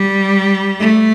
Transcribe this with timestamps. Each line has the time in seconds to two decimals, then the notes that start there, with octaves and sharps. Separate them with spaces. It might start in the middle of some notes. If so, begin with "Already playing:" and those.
Already playing: G3
0.80 A3